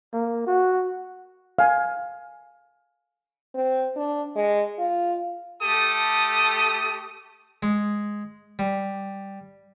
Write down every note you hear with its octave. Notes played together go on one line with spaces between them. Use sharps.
A#3
F#4
F5 G#5
C4
D4
G#3
F4
A3 G4 A4 A5 D#6
G#3
G3